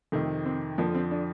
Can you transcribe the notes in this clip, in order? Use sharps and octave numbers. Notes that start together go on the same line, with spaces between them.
F2 C3 D#3 A3
C4
F2 D3 F3 A#3
C4
D4